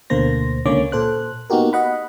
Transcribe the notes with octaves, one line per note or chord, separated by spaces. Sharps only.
D2 B2 D3 A#3 C5 A#6
C#2 D3 A#3 C#4 C#5 D6
A#2 A4 C5 F#6
A#3 B3 D#4 F#4 G4 A#4
D#5 F#5 B5